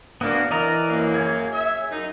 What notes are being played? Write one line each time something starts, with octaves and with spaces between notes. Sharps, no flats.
A#3 B3 D4 F#4
E3 A#4 D5 D#5 A#5
F#2 A#3
G#4 C#5
E5
F#2 D#4